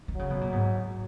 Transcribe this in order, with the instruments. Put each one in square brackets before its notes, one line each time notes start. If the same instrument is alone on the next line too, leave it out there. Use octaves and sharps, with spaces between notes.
[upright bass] D#3
[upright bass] C#3 [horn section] F#3
[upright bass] B2
A#2
G#2